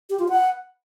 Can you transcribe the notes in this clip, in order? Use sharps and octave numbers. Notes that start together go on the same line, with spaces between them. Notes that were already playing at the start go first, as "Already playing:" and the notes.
G4
F4
F#5